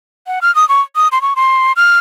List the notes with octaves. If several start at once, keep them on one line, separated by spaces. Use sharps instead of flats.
F#5
F6
D#6
C#6
D#6
C6
C#6
C6
F6